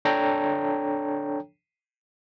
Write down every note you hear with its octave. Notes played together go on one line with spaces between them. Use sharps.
D4 A4 C#5 G5 A#5